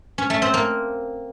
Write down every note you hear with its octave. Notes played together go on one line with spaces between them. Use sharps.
C#4
A3
C4
A#3